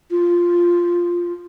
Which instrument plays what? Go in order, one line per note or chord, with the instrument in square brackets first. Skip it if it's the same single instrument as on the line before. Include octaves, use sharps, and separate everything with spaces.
[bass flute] F4